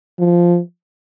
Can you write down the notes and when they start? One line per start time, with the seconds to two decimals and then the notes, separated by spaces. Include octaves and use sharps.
0.19 F3